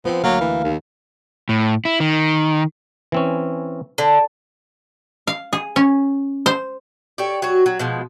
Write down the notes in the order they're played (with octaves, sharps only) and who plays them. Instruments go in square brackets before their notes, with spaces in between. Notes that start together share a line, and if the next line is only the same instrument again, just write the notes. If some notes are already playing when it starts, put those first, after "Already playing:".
[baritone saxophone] F3 [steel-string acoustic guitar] B3 C4
[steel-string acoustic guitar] D2 A#3 F5 [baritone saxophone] F#3
[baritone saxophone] E3
D#2
[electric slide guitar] A2
E4
D#3
[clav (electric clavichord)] E3 C4 C#4
[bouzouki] D3
[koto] F5
G#4
C#4
C5
[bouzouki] G4 A4 C#5 D5
F#3 F#4
F#3
B2 F3 G#3